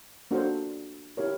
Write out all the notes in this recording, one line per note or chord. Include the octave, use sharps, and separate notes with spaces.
A#3 D4 F#4 A4 C5
E4 G4 A#4 C#5